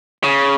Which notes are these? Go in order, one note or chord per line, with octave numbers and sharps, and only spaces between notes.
C#3